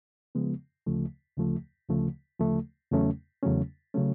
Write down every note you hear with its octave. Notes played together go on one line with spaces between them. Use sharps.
C#3 F3 G#3 B3
D2 C#3 F3 A3
D2 C#3 F3 A3
D2 C#3 F3 A3
D2 C#3 F3 A3
E2 C#3 F#3 A3 C#4
E2 C#3 F#3 A3 C#4
C#3 F#3 A3 C#4